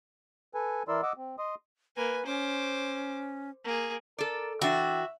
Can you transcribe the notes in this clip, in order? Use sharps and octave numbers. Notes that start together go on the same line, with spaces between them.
A4 B4 G#5
E3 E4 A#4 D5 C6 E6
D#5 F#5 D6 E6
C4
D#5 C6 D#6
A#3 B4 G#5
C#4 C5 D6
A#3 G#4
A4 A#4 D5
E3 D4 F#4 E5 G5